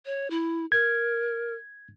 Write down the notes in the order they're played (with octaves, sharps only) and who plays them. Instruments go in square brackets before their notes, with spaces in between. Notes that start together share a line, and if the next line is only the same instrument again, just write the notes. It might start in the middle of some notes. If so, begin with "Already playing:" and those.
[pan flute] C#5
E4
[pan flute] A#4 [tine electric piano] G#6